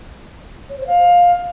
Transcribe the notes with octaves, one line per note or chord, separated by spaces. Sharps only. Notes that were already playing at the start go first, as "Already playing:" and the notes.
C#5
C5
F5